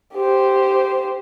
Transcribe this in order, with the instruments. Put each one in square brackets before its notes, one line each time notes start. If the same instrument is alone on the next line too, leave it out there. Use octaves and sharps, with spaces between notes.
[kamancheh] G4 C5